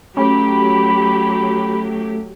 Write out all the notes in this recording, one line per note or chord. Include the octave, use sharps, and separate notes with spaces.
F#3 A3 C#4 G4 B5